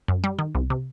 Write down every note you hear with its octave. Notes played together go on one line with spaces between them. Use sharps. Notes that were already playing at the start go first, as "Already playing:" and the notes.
F#2
G3
D#3
C2
C3